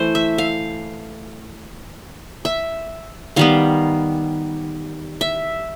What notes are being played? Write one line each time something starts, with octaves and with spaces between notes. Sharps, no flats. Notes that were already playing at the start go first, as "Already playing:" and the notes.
Already playing: E3 A3 C5
E5
F5
E5
D#3 G3 B3 F5
E5